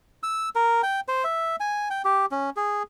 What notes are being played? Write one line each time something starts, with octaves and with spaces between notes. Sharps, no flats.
E6
A#4
G5
C5
E5
G#5
G5
G4
C#4
G#4